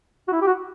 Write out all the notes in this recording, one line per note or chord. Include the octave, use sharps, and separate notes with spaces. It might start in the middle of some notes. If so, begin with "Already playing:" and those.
F#4
E4
G4
F#4